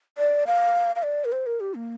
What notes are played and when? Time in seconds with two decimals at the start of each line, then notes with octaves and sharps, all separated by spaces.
0.18 D5
0.47 F5
0.96 F5
1.03 D5
1.25 A#4
1.32 C5
1.46 A#4
1.60 G4
1.75 A#3